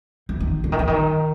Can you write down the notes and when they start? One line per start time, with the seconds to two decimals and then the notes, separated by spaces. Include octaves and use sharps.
0.29 E3
0.40 D#3
0.64 D3
0.72 D#3
0.79 D3
0.87 D#3